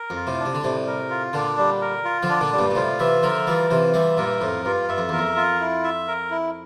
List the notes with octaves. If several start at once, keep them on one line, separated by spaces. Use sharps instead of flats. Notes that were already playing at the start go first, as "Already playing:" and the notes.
Already playing: A#4
F2
F4
A2 C3
D4
C3
D3
A2 C3 G3
A#4
F4
A#2 D3 D4
G3
A#4
F4
D3 F3
D4
A#2 D3
G3
G2 A#2
A#2
A2 C3 F4
C3 E3 E5
D3 F3 A#4
E3 G3 F4
C3 E3 F4
E3 G3 E5
G2 A#2 A#4
F2 A2 F4
G2 F4
G2 E5
F2
E2 A#4
F2
F4
E4
E5
A#4
E4